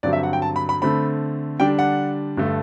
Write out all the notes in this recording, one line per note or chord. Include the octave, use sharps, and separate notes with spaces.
G2 D3 F#3 C4 D5
E5
F#5
G5
A5
B5
B5
D3 A3 C4 B5
D3 G3 D4 G5
F#5
G2 D3 A3